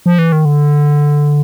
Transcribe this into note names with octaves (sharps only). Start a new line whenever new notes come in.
F3
E3
D#3
D3